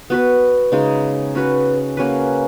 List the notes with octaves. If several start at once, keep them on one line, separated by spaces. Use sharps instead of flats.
B3 F#4 B4
C#3 G#3 D#4
C#4 F#4 B4
A#3 C#4 F#4 B4